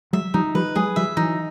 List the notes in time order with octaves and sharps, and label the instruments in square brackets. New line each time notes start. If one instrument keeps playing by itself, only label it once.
[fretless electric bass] F#3 G#3 [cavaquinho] E5
[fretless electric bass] F3 G3 [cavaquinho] D#4
[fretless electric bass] F3 G3 [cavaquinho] B4
[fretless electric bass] F#3 G#3 [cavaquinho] G#4
[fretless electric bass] F3 G3 [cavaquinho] E5
[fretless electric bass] E3 F#3 [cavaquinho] D#4